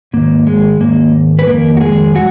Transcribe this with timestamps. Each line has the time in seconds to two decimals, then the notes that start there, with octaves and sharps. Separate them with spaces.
0.13 G#2 D#3 A#3
0.47 G#3
0.80 G#2 D#3 A#3
1.39 B4
1.47 F2 D#3 A#3 A#4
1.77 F#4
1.81 G#3 G#4
2.15 F#3 F#4